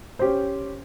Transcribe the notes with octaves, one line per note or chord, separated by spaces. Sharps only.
C#4 G4 C5